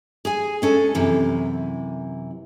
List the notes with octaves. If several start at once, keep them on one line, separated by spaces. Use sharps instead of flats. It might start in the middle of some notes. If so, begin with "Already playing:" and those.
G#4 G#5
G#3 C#4 A4
F#2 C3 E3